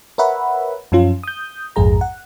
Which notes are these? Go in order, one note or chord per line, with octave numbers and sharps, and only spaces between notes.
A#4 B4 C#5 E5 F#5 B5
F#2 F3 C#4 F4
D#6 G6
A#1 F2 G#2 G#4 A#5
F#5